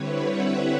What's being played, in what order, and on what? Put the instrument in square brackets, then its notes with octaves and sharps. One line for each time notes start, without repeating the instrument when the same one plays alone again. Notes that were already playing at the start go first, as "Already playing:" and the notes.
Already playing: [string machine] D3 G3 C4 E4 B4 C#5
E5 F#5